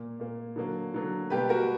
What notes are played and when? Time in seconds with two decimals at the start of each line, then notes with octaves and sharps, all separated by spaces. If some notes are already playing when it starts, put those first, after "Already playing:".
Already playing: A#2 A#3
0.19 A#2 A#3
0.56 D3 F#3 A#3
0.94 D3 F#3 A#3
1.30 B2 G3 A#3 G4 B4
1.49 F#4 A#4